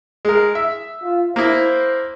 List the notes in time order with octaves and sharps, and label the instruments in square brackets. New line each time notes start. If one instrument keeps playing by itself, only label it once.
[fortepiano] G#3 A#4
E5
[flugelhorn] F4
[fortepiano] A#3 E4 [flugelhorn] C5